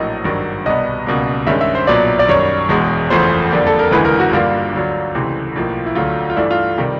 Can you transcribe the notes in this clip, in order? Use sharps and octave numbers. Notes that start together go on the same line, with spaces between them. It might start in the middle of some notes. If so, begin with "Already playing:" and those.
Already playing: A#1 A2 F#3 A#3 D#5
G#1 G2 D#3 F#3
C2 B2 G3 B3 D#5
C#2 B2 G3 A#3
G2 D#3 G#3 C#4 E5
E5
C5
B1 A#2 F#3 B3 D5
D5
F#2 D#3 G3 C#5
E1 E2 B2 G#3
F#1 E2 C#3 F3 A3 C5
F2 D3 G3 A#3
A4
A#4
E1 D2 C#3 E3 G#3 B4
A#4
F#4
G2 D3 G3 A#3 F4
D2 D3 F#3
C#2 C3 E3 A3 C4
B1 A2 F3 A#3
E4
D2 D3 F#3 A3 F4
F4
G2 E3 A3 D4 E4
F4
C3 D#3 G3